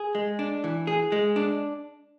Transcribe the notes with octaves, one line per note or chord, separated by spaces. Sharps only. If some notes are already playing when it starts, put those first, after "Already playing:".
Already playing: G#4
G#3
D4
E3
G#4
G#3
D4